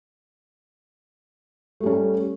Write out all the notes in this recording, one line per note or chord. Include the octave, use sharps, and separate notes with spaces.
G3 A3 C#4